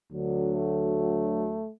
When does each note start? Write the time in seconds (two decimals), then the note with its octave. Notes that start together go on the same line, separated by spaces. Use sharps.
0.11 D2 D3 F#3
0.49 A3